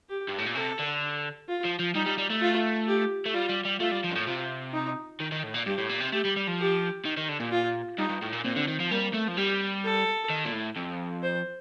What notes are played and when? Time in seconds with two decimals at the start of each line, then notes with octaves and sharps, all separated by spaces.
0.09 G4
0.28 G2
0.38 A2
0.46 A#2
0.55 C3 A4
0.79 D3
1.48 F4
1.64 F3
1.79 F3
1.95 G3 D#4
2.06 G3
2.18 G3
2.30 A3
2.42 F4
2.87 G4
3.26 A3
3.34 G3 F4
3.49 G3
3.65 G3
3.80 A3 F4
3.91 G3
4.04 F3
4.10 G2
4.15 A2
4.27 C3 F4
4.73 D#4
5.20 D#3
5.32 D#3
5.43 A2
5.54 A#2
5.66 G2 G4
5.78 A2
5.89 A#2
6.00 C3
6.12 A3 G4
6.25 G3
6.36 G3
6.48 F3
6.59 G4
7.05 D#3
7.17 D#3
7.29 D3
7.40 A#2
7.52 F4
7.98 G2 D#4
8.09 G2
8.22 A2
8.32 A#2
8.45 A#2 C4
8.56 D3
8.68 D#3
8.80 F3
8.91 G3 A#3
9.14 A3
9.28 F3
9.37 G3 G4
9.84 A4
10.30 D#3
10.45 A#2
10.53 A2
10.77 F2
11.23 C5